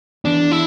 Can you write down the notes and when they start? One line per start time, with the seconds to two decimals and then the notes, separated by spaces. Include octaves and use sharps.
0.25 E2 D4
0.52 E4